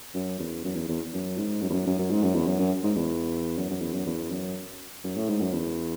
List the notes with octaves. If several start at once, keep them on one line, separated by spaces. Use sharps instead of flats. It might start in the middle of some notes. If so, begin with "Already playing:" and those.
F#2
E2
F#2
E2
E2
F#2
G#2
F#2
E2
F#2
F#2
F#2
G#2
F#2
E2
F#2
F#2
G#2
E2
F#2
F#2
E2
F#2
E2
F#2
F#2
A2
G#2
F#2
E2